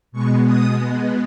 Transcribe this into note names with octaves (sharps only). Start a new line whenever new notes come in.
B2 G#3 B3 C#6
D#6